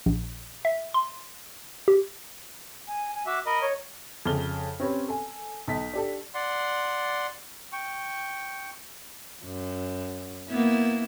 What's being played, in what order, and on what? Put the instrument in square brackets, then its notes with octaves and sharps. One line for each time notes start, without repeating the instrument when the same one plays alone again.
[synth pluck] A#1
E5
C6
G4
[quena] G#5
G#5
[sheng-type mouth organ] F#4 E5 [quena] D6
[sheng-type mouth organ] A#4 D#5 [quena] B5
[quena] C#5
[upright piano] F2 C#3 F6 G7
C4 C#4 G4 B4
A4 G#5
B1 B6
D4 G4 A4
[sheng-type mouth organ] D5 F#5 C6
G5 C#6
[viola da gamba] F#2
A#3 B3 E4